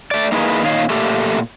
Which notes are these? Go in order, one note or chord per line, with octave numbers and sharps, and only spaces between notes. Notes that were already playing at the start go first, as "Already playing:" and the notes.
A3 D5
A#3 D#4 E4 G#4 B4
A#2 D#3 D#4 C#5 F5
A#2 A3 G4 A4